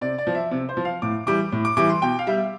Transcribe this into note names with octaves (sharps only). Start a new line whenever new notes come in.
C3 D5
D5
F3
E5
C3
C5
F3
F5
A2 D6
E3 G3 D6
A2
D6
E3 G3 D6
C6
B2 G5
F5
G3 E5